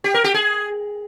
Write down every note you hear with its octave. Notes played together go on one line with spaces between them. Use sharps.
G4
A#4
G4
G#4